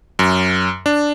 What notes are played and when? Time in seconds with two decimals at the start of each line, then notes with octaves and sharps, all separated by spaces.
0.19 F#2
0.86 D4